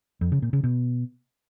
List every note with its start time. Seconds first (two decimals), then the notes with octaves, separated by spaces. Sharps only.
0.21 F2
0.32 C#3
0.42 A#2
0.53 C#3
0.63 B2